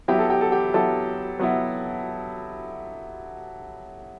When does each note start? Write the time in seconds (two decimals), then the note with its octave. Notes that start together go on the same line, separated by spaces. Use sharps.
0.08 F#3 B3 E4 G4
0.19 A4
0.30 G4
0.41 A4
0.52 G4
0.74 F#3 B3 E4 A4
1.39 F#3 B3 E4